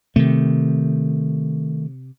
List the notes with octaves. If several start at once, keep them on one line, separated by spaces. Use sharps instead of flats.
C3 D#3 A3